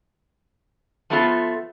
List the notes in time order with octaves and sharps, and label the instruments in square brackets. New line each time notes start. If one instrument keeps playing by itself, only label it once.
[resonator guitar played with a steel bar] F3 F#3 A3 B3 F4 A4